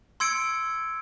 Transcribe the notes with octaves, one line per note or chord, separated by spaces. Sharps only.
C6 E6 G#6 C#7 D7